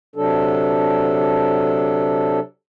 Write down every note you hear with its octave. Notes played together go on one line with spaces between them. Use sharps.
C3 F#3 D4 A4